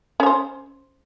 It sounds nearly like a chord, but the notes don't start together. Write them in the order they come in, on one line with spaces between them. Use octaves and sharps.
C#4 C#5 C5